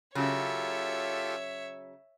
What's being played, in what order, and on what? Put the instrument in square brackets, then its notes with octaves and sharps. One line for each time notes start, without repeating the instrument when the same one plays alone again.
[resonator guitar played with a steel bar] C#3 F#3 [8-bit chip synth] F4 G4 A4 [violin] C#5 E5